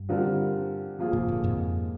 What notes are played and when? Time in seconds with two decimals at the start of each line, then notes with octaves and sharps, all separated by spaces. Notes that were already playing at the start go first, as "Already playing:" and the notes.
Already playing: G2
0.09 D3 G3 C4 F4 A#4
0.99 F3 A#3 F4 G#4
1.13 G#2 C3
1.28 A#2 D3
1.43 F2 G#2